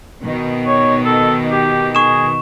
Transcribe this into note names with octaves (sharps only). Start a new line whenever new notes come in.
B2 D#3
C#5
A4
G4
G#4 C#6 E7